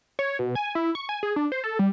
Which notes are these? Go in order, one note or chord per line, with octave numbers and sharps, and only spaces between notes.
C#5
B2
G#5
E4
C#6
G#5
G#4
D4
C5
A4
G3